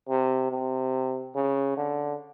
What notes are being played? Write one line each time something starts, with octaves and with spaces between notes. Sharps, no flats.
C3
C3
C#3
D3